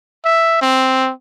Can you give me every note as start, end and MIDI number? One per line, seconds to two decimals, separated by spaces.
0.25 0.59 76
0.61 1.11 60